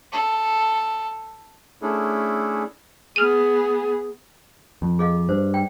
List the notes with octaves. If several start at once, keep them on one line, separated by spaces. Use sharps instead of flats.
A4
A3 C#4 D4 E4 G#4 A4
B3 G#4 F6 D#7
F2
G#4 D#5 F5
G2 C5
G5